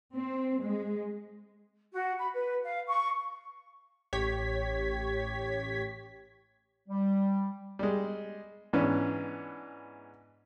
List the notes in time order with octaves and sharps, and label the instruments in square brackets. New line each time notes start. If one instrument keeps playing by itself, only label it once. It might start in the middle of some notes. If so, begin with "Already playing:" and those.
[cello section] C4
G#3
[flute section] F#4
B5
B4
F5
C#6
[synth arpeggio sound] A1 G4 C#5 G#6 B6
[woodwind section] G3
[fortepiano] G3 G#3
G#2 E3 B3 C#4 D4